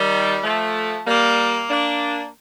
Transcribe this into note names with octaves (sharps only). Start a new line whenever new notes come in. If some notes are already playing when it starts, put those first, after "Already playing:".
Already playing: D#3 G3
F3 A3
G3 A#3
A#3 D4